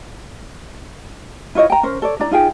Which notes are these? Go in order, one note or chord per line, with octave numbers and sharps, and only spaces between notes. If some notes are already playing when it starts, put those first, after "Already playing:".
E4 F4 C#5 D#5
G5 A#5
C#4 A#4 C5
A4 C#5 D5
D4 E4 D5 A#5
D#4 F4 G#4 G5